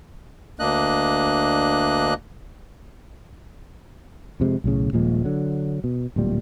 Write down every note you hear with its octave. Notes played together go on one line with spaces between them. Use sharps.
D2 A#3 D4 D#5 F#6
F2 C3 G#3
B1 A2 C#3
D#1 A#2 F3 G#3
D3 F#3
B2
D1 A#2 G3